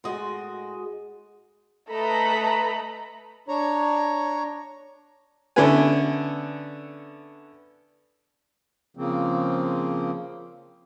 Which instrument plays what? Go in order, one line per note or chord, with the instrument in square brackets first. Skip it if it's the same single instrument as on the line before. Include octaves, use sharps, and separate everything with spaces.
[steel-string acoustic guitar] A2 F#4 [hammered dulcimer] G#3 D#5 C6
[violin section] A3 A4 B4 D#5 A#5 B5
[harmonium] D4 C#5 A#5
[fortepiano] D3 B3 C#4 E4 B4 G#5
[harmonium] C#3 F3 A#3 C4